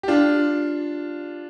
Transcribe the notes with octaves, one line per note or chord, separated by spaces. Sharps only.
G4
D4 F4